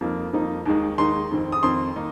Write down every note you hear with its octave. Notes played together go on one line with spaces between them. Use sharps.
F2 F3 A#3 D#4
F2 F3 A#3 D#4
D#2 D#3 G#3 D#4
D#2 D#3 G#3 D#4 C6
F2 D#3 C4
D#6
F2 D#3 C4 C6
D#3 A#3 D#4